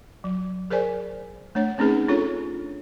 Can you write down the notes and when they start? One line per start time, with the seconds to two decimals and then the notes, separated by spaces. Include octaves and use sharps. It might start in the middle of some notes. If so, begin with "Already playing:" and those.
0.24 F#3
0.70 G#4 A#4 C5 D5 G#5
1.55 A3 D4 C#5
1.78 A3 C4 C#4 D#4 G#4 B4
2.09 D4 F4 A4 C#5